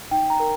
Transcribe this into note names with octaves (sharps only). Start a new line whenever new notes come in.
D#4 G5
A#5
A#4